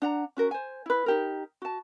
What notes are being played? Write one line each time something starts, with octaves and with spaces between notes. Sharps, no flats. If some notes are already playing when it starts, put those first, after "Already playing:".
D4 F#5 A#5
C#4 F#4 A#4
C5 G#5
E4 B4
D#4 G4 A#4
F#4 A5